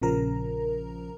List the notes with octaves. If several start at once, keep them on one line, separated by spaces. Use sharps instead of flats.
A#1 C#3 F3 A#4 A#5